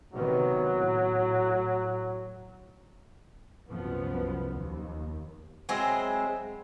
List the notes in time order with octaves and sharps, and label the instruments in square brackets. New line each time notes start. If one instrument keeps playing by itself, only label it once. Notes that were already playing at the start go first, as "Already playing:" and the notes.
[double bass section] C3 D#3 B3 [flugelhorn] F#3
[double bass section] A2
C2 F#2 F3 B3
D#2
[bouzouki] F#3 G#3 C4 E4